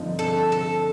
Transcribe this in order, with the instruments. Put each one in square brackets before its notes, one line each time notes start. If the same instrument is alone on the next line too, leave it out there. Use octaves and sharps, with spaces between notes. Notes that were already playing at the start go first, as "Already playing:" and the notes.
Already playing: [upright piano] G2 D3 F3 C4 D#4
[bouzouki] A4
A4